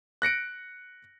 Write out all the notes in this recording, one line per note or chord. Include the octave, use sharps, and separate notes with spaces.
F#6 A#6 C#7 D7